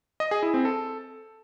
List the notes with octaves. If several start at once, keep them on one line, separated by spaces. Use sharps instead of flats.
D#5
G#4
E4
C4
A4